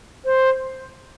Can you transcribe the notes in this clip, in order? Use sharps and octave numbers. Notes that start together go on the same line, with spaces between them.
C5